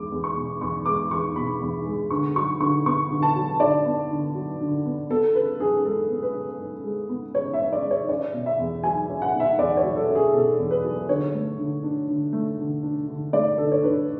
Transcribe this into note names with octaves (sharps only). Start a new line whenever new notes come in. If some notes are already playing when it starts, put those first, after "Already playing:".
Already playing: E2 G#3 D6
E2
C#6
B2
E2 C#6
G#3 D6
E2 C#6
B2 B5
E2
G#3
D3 C#6
F#3 C#6
D3 C#6
B3 C#6
D3
A5
F#3
D3 D5
B3
D3
F#3
D3
B3
B3 A4
C#3 B4
F#2 G#4
G#3 A4
B3
B4
C#3
F#2
G#3
B3
C#3 C#5
E5
F#2
D5
G#3
C#5
C#4 D5
B2
E5
E2
F#3 G#5
C#4
F#5
B2
E5
E2 D5
C#5
F#3
A4
C#4
G#4
B2 A4
E2
B4
F#3
D3 C#5
A3
D3
D4
D3
A3
D3
D4
D3
A3 D5
D3 A4
C#5
D4 B4